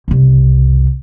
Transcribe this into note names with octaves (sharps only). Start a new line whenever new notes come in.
F#1 C2